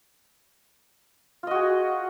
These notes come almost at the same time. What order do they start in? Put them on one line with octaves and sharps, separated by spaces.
F4 D#5 F#4 G#4